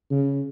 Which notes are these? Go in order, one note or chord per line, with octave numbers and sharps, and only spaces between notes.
C#3